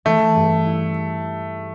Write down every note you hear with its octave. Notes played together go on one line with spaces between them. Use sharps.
E3 A3
G2
E4